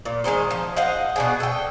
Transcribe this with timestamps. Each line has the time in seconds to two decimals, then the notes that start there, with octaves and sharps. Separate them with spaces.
0.05 A#2
0.24 D#3 G#3 D#4 C5
0.51 F3
0.76 C5 D#5 F5 F#5
1.16 B2 D4 G#4
1.40 A4 G5